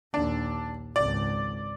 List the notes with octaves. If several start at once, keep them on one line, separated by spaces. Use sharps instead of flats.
A#1 D#2 D4
G#1 C#2 D5